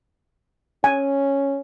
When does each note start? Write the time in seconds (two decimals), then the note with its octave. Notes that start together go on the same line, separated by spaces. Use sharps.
0.84 C#4 G#5